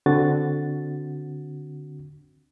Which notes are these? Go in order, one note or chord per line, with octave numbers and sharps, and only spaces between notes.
D3 C4 F#4 A6